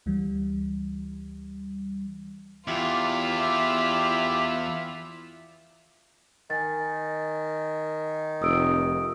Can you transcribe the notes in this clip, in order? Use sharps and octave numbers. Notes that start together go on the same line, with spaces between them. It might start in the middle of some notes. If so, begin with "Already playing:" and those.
D2 E3 G3
E2 E4 F4 G4 D6
D#3 G#5 A6
F1 D#6 E6 D7